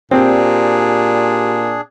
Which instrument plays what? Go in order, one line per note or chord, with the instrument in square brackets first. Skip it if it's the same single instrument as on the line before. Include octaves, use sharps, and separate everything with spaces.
[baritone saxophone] A#2 [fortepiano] C4 [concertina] D4 G#4 [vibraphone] G4 D5